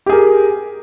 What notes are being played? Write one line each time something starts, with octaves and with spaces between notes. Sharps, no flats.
G4 G#4 A#4